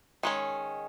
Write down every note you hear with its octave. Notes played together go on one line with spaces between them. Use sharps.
D#3 G#3 C#4